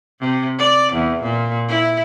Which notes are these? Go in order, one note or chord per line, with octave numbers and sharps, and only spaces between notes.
C3
D5
E2
A#2
E4